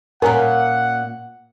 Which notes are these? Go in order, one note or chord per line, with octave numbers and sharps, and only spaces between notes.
A#2 C#4 A#4 F#5 G#5 A#5